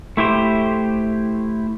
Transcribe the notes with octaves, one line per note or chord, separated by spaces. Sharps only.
A3 E4 G4 C5